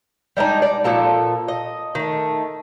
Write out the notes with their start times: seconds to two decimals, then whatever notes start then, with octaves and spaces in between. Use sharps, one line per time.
0.37 G3 G#3 D4 D#4
0.62 D5
0.84 A#2 F3 A4 A#4
1.48 D#5
1.95 D#3 A3